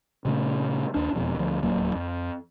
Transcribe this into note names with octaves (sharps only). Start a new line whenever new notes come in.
A#2 C#3 A3
D#2 D4
E1 F2 B2
D2 F3
D1 D#2 F#3 A#3
F2